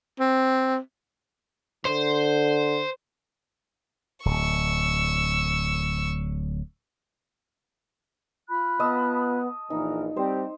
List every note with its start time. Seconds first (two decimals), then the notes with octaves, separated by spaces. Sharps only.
0.20 C4
1.85 D3 C5
4.25 D1 C#6 E6
8.47 F4 B5 F#6
8.80 B3 D#5 A5 E6
9.70 A#1 E3 D#4 A#4
10.17 G3 C4 G4 C5